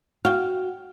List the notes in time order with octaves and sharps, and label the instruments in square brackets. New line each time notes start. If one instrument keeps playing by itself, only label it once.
[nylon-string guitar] F#4 [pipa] F5 G5